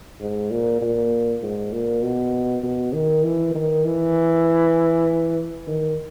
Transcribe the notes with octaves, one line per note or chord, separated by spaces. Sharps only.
G#2
A#2
A#2
G#2
A#2
B2
B2
D#3
E3
D#3
E3
D#3